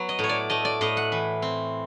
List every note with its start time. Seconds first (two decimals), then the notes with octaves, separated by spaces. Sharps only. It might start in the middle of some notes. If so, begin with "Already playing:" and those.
Already playing: F#3 B3 B4
0.09 D#5
0.19 A2 C#5
0.29 D5
0.50 A3 D#5
0.65 D5
0.81 A2 D#5
0.97 F#5
1.12 E3
1.42 C4